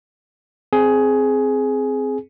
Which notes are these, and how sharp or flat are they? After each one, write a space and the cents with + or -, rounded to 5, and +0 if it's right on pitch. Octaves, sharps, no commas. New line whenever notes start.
C4 +0 G#4 +15